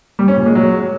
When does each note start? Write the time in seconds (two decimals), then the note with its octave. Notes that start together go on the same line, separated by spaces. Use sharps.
0.19 G3
0.28 C#4
0.37 A#2
0.46 G#3
0.55 F#3